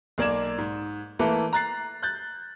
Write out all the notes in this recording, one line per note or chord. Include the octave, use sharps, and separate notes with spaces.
B1 A#3 D5 G#6 E7
G#2
E3 A3 A#3 A4 B4
A#5 F#6 A6 C7
F#6 G6 A6